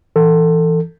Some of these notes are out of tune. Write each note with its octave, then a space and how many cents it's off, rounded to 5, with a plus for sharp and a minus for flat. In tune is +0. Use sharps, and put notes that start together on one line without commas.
E3 +0 A4 +20